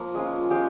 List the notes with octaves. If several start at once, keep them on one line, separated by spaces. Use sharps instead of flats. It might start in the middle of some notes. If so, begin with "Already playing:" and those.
Already playing: F3 A#3
G#3 C#4 F4
G#3 C#4 F4 G4